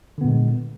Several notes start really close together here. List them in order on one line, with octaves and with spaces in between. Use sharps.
D3 B3 A#2 G#3